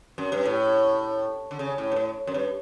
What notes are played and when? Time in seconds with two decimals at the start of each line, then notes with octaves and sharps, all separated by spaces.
0.18 F#2
0.32 G2
0.46 A2
1.51 D3
1.59 C#3
1.78 A2
1.92 G2
1.96 A2
2.27 F#2
2.34 G2